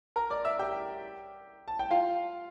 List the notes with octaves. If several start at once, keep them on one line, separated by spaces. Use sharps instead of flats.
A#4 A#5
D5 D6
E5 E6
G4 G5
A5
G5
F4 F5